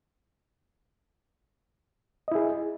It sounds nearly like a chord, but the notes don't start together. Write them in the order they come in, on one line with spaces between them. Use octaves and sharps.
D#5 E4 G#4